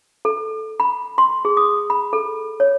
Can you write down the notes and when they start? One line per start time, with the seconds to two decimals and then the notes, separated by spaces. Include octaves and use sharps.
0.25 A4
0.80 B5
1.18 C6
1.45 G#4
1.57 D#6
1.90 B5
2.13 A4
2.60 C#5